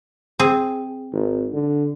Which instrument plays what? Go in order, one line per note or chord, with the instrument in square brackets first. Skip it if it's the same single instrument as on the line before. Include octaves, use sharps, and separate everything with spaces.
[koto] C4 G#4
[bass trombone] G#1
D3